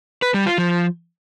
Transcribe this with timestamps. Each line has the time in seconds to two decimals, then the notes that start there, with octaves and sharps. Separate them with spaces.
0.22 B4
0.34 G3
0.46 F4
0.58 F3